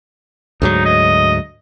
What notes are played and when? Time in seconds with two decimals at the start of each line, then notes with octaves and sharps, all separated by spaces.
0.62 D2 G#2 F#3 D#4
0.85 D#5